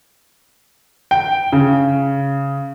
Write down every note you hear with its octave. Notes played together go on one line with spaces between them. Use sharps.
G5
C#3